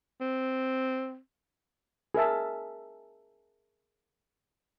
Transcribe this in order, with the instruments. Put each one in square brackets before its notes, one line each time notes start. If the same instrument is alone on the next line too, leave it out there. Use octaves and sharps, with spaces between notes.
[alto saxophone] C4
[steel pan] G#4 A#4 E5 A5